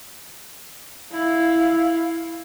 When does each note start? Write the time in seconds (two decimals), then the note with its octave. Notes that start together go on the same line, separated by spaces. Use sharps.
1.12 E4 F5